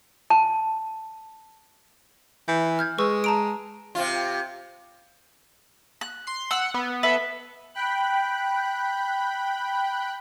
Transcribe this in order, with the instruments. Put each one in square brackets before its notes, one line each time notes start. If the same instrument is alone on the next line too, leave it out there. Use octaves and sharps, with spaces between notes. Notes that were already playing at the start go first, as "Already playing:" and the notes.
[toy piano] A5
[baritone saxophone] E3 [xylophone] G6
[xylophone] F6 G6 G#6
[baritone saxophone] G#3 [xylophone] B4 C#6 E6
[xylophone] A5 A#5 D7
[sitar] C3 F4
[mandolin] F#6
[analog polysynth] C6 C7
[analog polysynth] F#5 [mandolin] E6
[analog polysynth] B3
[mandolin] A4 B4 E5
[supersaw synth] G5 B5 F#6